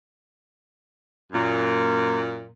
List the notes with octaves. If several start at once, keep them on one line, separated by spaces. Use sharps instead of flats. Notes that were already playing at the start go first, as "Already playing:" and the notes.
F#2 A#2